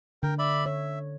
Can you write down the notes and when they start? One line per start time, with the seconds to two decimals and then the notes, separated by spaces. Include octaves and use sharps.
0.23 D3 A#4 G5
0.39 D5 E5 B5
0.66 C#5 E5